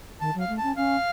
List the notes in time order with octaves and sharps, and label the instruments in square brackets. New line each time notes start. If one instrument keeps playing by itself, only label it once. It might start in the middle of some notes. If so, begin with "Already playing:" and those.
[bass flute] D#3 [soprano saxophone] A5
[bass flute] F#3 [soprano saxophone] F5
[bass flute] A3
[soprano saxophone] A5
[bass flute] C#4
[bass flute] C#4 [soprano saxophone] F5